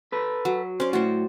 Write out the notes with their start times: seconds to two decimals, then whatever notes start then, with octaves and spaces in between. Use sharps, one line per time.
0.12 A4 B4
0.45 F#3
0.80 C#4 C5 D5
0.93 A2 F#4 C5